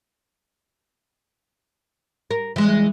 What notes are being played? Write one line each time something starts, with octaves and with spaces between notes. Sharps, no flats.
A#4
E3 G#3